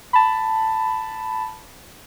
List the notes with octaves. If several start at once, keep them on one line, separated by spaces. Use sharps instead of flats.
A5 B5